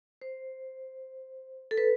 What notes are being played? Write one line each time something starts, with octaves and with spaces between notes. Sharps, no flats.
C5
A4
B4